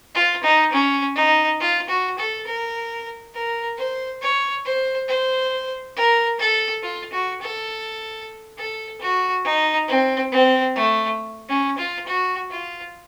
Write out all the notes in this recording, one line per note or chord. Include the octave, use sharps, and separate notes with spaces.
F4
D#4
C#4
D#4
F4
F#4
A4
A#4
A#4
C5
C#5
C5
C5
A#4
A4
F4
F#4
A4
A4
F#4
D#4
C4
C4
A3
C#4
F4
F#4
F4